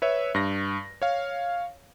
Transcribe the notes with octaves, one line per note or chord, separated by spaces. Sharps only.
B4 C#5 E5
G2 A#6
C#5 F5